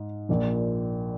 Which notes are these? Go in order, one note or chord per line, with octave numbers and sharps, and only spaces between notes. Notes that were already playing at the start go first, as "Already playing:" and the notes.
Already playing: G#2
A#1 A#2 F3